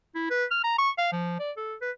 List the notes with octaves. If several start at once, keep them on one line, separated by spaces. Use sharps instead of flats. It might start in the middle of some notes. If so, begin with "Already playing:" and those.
E4
B4
F6
A#5
C#6
F5
F3
D5
A4
B4